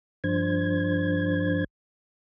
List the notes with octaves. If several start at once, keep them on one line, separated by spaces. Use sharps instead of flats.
G2 F3 D4 C5 G#6